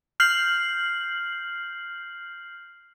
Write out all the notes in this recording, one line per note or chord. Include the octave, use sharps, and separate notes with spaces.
F6 G6 C7 F#7